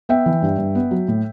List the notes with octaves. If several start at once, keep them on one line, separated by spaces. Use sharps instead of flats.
B3 E5 G5
E3
G2
G2
B3
F#3
A2